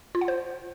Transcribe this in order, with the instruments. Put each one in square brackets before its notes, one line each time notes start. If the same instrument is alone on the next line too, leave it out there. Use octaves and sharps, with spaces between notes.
[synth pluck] F4
F#5
C5